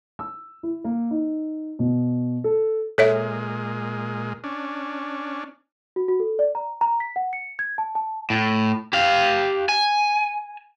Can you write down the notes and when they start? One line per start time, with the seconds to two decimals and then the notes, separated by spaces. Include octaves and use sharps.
0.19 E6
0.63 E4
0.84 A#3
1.11 D#4
1.79 B2
2.44 A4
2.98 A#2 G#3 A4 C#5 E5
4.44 C#4 D4
5.96 F#4
6.08 F#4
6.20 A4
6.39 D5
6.55 A#5
6.81 A#5
7.00 B6
7.16 F#5
7.33 C#7
7.59 G#6
7.78 A5
7.95 A5
8.30 A2
8.93 G4 F5
9.69 G#5